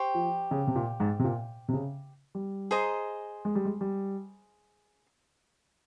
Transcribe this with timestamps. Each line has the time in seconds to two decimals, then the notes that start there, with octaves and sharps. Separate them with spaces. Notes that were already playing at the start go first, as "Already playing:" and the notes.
Already playing: G4 C5 G5 C#6
0.15 F3
0.51 C#3
0.67 C3
0.76 A#2
1.00 G#2
1.19 C3
1.24 A#2
1.68 C3
1.73 C#3
2.35 G3
2.71 G#4 C5 D#5 A#5
3.45 G#3
3.55 G3
3.65 G#3
3.81 G3